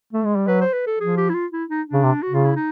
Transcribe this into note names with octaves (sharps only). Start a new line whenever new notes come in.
A3
G#3
G3
F#3 B4
C5
B4
A4
F3 G#4
G4
E4
F4
E4
D#4
D4
C#3
C3
F#4
C#3 F4
E4
D#4